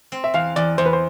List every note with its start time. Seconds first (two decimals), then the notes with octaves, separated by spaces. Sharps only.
0.12 C4
0.24 E5
0.34 E2 F5
0.56 E2 D5
0.78 E2 C5
0.86 B4
0.93 C5